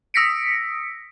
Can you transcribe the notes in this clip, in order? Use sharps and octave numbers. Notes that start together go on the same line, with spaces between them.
D#6 E6 A#6 B6 C#7 D7